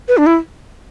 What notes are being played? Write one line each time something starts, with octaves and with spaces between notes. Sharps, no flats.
B4
D4
E4